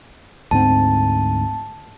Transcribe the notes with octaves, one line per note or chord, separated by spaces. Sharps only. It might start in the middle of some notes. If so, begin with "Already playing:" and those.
D2 G#2 C4 A5